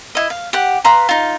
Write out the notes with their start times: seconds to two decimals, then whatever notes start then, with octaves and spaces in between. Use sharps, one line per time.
0.15 E4 D#5
0.30 F5
0.53 G4 F#5
0.84 B4 F5 A#5 C6
1.09 D#4 F4